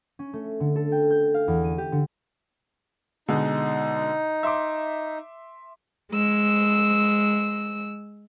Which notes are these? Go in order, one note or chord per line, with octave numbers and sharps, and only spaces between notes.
C#4
A3
D3
A4
G5
G6
F5
E2
D#7
G4
D3
B2 D3 G#3 D#4
E5 C6 D6
G#3 E6